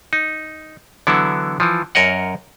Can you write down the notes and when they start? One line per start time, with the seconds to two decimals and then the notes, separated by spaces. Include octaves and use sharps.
0.13 D#4
1.07 D3 E3 F#3 B3 E4
1.60 E3 F3
1.95 F#2 A#4 C#5 D#5 F#5